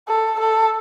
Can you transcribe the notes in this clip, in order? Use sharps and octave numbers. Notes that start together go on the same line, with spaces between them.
A4
A4